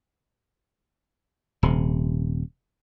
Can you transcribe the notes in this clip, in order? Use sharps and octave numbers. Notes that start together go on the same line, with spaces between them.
D#1 C3